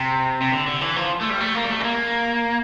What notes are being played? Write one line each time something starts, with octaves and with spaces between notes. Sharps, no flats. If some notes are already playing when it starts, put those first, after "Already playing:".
Already playing: C3
C3
D3
D3
E3
F3
A3
G3
A3
A#3
G3
A3
C4
A#3